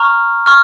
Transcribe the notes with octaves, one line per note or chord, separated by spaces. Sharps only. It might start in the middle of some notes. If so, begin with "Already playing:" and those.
Already playing: A#5 C#6 F6
C#6 F6